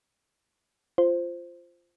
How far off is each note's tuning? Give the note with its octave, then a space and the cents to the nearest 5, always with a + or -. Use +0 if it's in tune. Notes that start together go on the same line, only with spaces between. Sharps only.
F4 -10 C5 +0